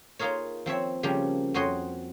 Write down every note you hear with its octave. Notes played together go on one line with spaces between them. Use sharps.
A#3 D#4 F4 G#4 A#4 C#5
F3 C4 C#5 E5
C#3 F3 G3 A#3 G4
F2 F#4 C5 C#5 D#5 C6